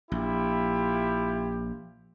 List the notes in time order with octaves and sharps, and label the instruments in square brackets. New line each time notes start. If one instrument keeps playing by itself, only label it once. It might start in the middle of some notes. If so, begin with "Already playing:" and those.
[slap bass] A#1 [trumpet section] E4 F4 G4